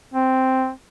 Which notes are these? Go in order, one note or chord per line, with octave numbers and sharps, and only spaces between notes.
C4